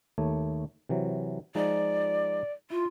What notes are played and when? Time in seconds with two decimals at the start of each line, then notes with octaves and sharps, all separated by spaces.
0.18 D#2 A3 C#5
0.89 C3 E3 F#3
1.55 F3 G#3 D#4 D5
2.70 E4 F4